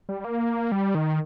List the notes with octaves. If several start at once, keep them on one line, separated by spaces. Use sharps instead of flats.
G3
A#3
G3
D#3